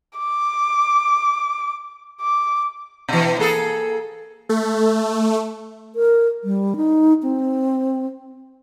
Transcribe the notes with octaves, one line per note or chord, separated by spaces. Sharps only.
D6
D6
B2 E3
A#3 G#4 A4
A3
A#4
G3
D#4
C4